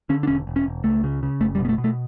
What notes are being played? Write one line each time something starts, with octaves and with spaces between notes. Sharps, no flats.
D3 C#4
D4
E1 C#4
E1
C#4
E1
C#2 A3
C#3
C#3
F#1 A3
G3
B2
B3
A3
B2
A3